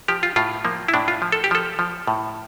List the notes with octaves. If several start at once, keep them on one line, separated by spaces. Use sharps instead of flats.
F3 G4
F4
A2 F4
F3 A#3
E4
A2 D4
F4
F3
A4
G4
F3 A4
F3
A2